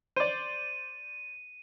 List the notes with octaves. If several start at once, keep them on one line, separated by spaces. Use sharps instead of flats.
C5 D5 D#7